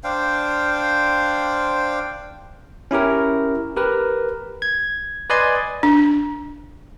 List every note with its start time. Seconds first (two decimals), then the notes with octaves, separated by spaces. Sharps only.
0.04 D4 C5 F5 G5
2.91 C#4 E4 G4 A#4
3.76 G4 A#4 B4
4.62 G#6
5.30 B4 D5 D#5 G#5 C6
5.83 D4